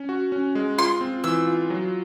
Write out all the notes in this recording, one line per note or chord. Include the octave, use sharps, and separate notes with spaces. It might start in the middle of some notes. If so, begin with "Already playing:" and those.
Already playing: C#4
F#4
C#4
G#3
F4 C6
C4
E3 E6
F4
F#3